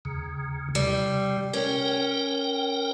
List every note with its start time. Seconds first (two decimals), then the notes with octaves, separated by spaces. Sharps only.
0.05 D#2 C#3
0.75 C3 G3
1.53 C#4 A#4 G5